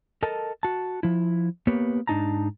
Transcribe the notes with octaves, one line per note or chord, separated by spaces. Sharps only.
A4 A#4 D#5 A5
F#4 A5
F3 E4
A#3 B3 G4 B4 C#5
G#2 D4 D#4 A5 A#5